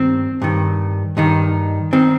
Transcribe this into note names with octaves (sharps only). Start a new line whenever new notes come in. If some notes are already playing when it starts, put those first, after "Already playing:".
Already playing: G2 D#3 C4
G2 D#3
G2 D#3 D#4
D#3 C4